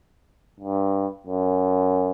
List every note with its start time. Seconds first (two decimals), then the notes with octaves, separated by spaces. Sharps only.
0.60 G2
1.27 F#2